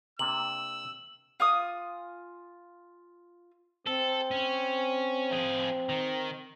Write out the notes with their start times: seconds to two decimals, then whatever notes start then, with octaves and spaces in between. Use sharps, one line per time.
0.19 C3 A#3 D4 E6 F#7
1.40 F4 G#5 D#6
3.87 C4 A4
4.31 C#4
5.31 F3 G#4
5.89 D#3